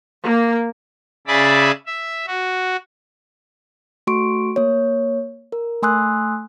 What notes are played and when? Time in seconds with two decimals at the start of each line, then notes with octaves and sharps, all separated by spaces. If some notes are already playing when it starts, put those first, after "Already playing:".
0.24 A#3
1.27 C#3 G#4 D5 E5 A5 B5
1.86 E5
2.27 F#4
4.07 A3 F#4 C6 C#6 D7
4.56 A#3 C#5
5.52 A#4
5.83 A3 G#5 C6 D#6 E6 F#6